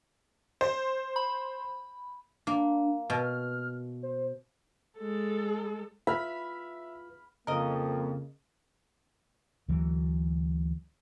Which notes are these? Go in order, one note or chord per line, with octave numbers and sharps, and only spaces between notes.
C5
B5
A#3 D4
B2 F6
C5
G#3 A4
F4 B4 E5 B5 F6
F2 C#3 A#3 A#4 D#5
D2 E3 F#3